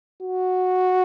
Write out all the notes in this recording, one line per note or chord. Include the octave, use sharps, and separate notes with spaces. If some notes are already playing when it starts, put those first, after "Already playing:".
F#4